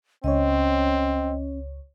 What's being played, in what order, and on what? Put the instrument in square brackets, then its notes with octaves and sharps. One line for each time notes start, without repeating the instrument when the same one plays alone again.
[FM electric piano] C#2 C#5 [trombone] C4 [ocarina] C#4 [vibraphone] D#5